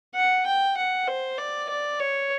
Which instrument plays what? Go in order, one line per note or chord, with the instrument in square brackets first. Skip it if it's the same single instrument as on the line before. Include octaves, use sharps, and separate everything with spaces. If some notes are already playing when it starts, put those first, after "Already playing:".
[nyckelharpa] F#5
G5
F#5
C5
D5
D5
C#5